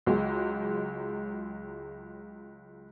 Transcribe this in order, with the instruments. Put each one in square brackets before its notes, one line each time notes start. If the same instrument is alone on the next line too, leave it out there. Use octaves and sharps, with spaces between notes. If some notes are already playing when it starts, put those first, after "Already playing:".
[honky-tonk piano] C#2 F#3 G#3